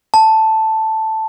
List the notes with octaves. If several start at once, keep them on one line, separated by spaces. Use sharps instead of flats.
A5